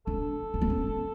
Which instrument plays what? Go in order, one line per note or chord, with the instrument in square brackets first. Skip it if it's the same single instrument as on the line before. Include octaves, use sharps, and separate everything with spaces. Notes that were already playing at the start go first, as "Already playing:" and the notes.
[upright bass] D4 [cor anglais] A4
[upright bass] C#4
B3
C#4